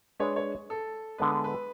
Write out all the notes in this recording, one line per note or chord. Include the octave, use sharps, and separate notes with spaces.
G#3 D4 G#4 B4 C#5
C#5
A4
D3 G#3 B3 B4
B4